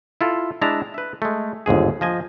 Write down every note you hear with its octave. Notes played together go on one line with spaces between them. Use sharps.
E4 F4 A4
G#3 D4 E4 A5 A#5
B4 E5
G#3 A3
G1 D#2 G#2 G#4
F3 D#5 G#5